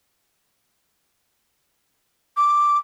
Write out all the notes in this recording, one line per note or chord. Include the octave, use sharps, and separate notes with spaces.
D6